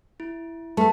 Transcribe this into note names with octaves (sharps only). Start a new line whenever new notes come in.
E4
A3 B4 A5